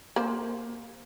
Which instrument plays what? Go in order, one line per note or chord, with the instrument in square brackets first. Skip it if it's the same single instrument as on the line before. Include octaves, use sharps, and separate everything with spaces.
[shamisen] A#3 C5